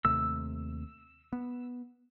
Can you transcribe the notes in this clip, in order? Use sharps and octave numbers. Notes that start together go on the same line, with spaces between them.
D#2 C3 A3 E6
B3